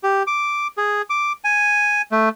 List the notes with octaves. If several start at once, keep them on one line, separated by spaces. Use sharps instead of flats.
G4
D6
G#4
D6
G#5
A3